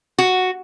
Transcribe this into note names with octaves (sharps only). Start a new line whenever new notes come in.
F#4